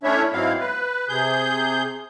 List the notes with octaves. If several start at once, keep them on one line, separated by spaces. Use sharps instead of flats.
A3 C#4 D4 E4 C#5 E5
G#2 F#3 B3 C4 E4 F5
B4
C3 G#4 G6